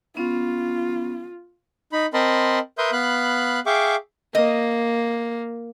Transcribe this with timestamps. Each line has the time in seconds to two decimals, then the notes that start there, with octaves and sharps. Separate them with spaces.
0.17 B3 C#4 F4
1.93 D#4 B5
2.14 C4 A#4 D#5 A5 B5 C6
2.78 A#4 B4 E5 C6 D#6 G6
2.92 B3 F5 B5 F#6
3.66 G#4 E5 F5 G5 C#6 D6
4.35 A#3 D#5